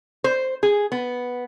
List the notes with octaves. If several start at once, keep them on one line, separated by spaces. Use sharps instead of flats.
C5
G#4
B3